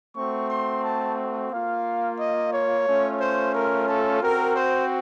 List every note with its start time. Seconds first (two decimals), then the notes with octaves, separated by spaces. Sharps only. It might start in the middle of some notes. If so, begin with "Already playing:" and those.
0.17 A3 C4 F#4 C#6
0.51 C6
0.84 A5
1.52 A#3 F4 F5
2.20 D#5
2.53 C#5
2.87 A3 C#4 F4
3.21 C5
3.55 A#4
3.89 A4
4.22 C4 F#4 A#4
4.56 C5